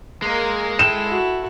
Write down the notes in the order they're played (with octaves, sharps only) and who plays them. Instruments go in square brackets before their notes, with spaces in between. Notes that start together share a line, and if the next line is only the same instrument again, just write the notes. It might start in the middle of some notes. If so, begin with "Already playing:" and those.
[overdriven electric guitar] G#3 [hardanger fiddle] A#3 A#4
[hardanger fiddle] E4 A4 [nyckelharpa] G5 [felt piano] E7
[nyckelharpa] F#4